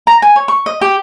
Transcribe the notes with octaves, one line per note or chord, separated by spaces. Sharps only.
A#5
G#5
C#5
C#6
D#5
G4